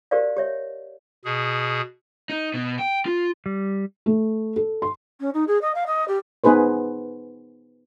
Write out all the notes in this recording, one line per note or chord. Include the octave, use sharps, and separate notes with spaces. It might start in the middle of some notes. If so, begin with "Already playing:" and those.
F#4 G4 A#4 C5 D5 F5
G4 C#5 E5
B2 G#4
D#4
B2
G5
F4
G3
A3
A4
C6
C#4
D#4
G#4
D#5
F5
D#5
G4
B3 D#4 G#4 B4 C5